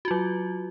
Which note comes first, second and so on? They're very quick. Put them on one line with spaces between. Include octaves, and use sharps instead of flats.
F#4 F4 F#3